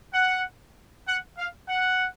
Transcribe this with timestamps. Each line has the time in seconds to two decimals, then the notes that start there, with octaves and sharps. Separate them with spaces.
0.13 F#5
1.07 F#5
1.37 F5
1.68 F#5